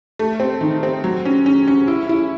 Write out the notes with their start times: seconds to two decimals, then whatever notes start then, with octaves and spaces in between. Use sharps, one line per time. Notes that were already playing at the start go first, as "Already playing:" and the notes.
0.19 A3
0.40 C4
0.61 D#3
0.83 C4
1.04 F#3
1.25 C#4
1.46 C#4
1.68 C#4
1.88 E4
2.09 E4